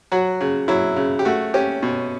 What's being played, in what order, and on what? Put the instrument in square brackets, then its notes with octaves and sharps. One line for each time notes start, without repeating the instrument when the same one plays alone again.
[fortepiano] F#3 F#4
C#3
F#3 E4
C#3
G4
A3 F#4
C#4 G4
B2